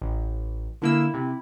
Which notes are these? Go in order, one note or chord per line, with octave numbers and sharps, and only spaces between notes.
A1
D3 A#3 E4 E6
C3